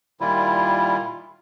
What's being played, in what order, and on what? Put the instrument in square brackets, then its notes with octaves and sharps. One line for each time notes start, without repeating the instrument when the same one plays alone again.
[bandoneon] A#2 D#3 G3 E4 F4